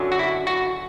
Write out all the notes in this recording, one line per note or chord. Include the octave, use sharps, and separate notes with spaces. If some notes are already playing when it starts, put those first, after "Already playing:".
Already playing: F#2 D3 F#3
F#4
E4
F#4